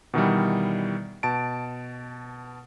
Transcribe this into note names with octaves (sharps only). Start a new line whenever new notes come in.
B2 D#3 E3 G3
B2 A5 D7